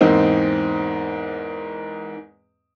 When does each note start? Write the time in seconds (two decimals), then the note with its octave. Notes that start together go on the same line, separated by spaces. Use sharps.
0.01 E2 G#2 A#3 C4 D#4